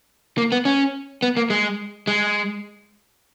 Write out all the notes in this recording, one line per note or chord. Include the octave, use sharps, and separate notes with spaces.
A#3
B3
C#4
B3
A#3
G#3
G#3